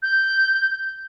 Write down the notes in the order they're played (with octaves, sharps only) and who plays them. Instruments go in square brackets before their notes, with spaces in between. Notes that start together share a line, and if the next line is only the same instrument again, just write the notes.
[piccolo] G6